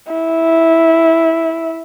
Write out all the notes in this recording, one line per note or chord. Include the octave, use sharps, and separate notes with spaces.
E4